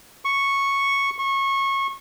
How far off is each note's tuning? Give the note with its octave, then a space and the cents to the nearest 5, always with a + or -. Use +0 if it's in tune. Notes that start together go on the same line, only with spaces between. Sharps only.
C#6 -5
C#6 -25